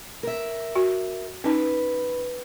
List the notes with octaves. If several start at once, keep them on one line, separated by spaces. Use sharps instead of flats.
A#4 E5
F#4
C#4 D#4 B4